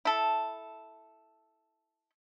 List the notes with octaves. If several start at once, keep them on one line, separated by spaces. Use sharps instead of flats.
E4 A4